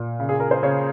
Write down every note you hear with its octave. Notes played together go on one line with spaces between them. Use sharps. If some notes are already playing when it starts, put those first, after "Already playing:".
Already playing: A#2
C#3
G#4
A#4
C5
C#3 C#5